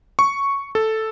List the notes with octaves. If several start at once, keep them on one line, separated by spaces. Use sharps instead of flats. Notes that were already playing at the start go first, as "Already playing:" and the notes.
C#6
A4